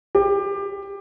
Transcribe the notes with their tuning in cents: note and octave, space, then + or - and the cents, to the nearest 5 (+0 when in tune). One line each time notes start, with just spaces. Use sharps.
G4 +20